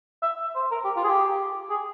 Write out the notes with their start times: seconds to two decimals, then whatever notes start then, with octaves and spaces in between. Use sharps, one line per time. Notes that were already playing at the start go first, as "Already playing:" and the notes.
0.22 E5
0.55 C5
0.71 A#4
0.85 G4
0.96 F4
1.04 G#4
1.08 G4
1.70 G#4